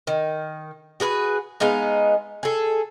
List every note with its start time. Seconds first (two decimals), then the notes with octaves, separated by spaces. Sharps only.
0.07 D#3
1.00 F#4 G#4 A#4 B4
1.60 G#3 B3 D#4 F5
2.43 G#4 A4